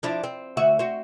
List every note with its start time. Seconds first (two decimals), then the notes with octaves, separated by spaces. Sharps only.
0.03 F3 D4 E4
0.24 C4
0.57 D2 F#4 E5
0.79 C4 F#4